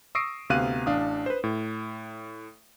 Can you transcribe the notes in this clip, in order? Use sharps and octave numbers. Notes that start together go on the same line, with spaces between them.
C#6 D#6 E6 A#6 C7 D7
D2 C3 B3 F5 F#6 D#7
A1 D4 F5 D#6
B4 C5
A2